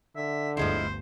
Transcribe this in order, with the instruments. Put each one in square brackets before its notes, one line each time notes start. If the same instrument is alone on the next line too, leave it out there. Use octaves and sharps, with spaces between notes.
[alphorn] D3 [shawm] E5
[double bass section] G1 D2 G2 [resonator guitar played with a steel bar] F3 G#3 E4 [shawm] C5